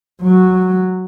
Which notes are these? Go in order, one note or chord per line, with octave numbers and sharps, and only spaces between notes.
F#3